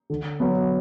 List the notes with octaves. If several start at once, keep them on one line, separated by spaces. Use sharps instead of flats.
D3
F#3 B3